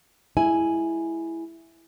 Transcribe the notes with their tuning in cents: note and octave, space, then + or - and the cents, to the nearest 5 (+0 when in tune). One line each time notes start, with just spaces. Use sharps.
G#3 +0 E4 +0 G#5 +0